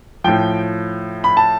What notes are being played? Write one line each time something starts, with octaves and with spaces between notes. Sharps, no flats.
A2 F3 G5
B5
A5